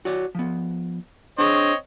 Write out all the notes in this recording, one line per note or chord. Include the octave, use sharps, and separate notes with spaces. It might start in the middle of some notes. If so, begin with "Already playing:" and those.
F#4 C#5 D5
F3 B3
C4 D4 G#4 C#5 D#5